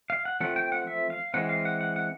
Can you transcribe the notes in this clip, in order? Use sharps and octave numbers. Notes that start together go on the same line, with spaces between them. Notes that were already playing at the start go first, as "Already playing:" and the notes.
F5
F#5
F3 A3 C4 F#5
G5
F#5
E5
F5
E3 G#3 C4 F#5
F5
F#5
F#5
F#5